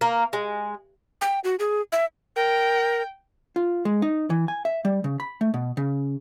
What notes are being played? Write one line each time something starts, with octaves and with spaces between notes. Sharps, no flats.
A#3
G#3
G5
F#4
G#4
E5
A#4 G5
F4
G#3
D#4
E3
G#5
E5
G3
C#3
B5
A3
B2
C#3